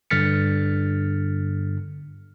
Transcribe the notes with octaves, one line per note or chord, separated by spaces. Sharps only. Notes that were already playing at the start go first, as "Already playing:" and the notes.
G2 D3 F6 A6 B6 C#7